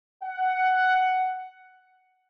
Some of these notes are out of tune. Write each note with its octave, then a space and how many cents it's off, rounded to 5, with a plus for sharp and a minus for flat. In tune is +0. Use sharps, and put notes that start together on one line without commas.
F#5 +10